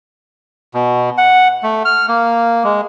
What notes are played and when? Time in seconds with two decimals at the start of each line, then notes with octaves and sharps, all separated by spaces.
0.74 B2
1.18 F#5
1.63 A3
1.85 F6
2.08 A#3
2.64 G#3